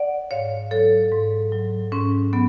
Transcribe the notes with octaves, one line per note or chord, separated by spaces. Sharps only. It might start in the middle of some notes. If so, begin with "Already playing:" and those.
Already playing: D5 F#5
G#2 C#5 F5
F#3 A4 C#5
G#2
F#3
G#2 C#4
F#3 B3